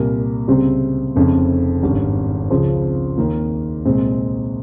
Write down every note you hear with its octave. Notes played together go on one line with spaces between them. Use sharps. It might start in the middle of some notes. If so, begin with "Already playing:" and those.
Already playing: C2 A#2 G3 A#3
C#2 C3 G3 C4
F1 F2 C#3
G#1 G2 G3 C#4
C#2 C#3 F3 C4
D#2 D#3 A#3
C2 A#2 G#3 C4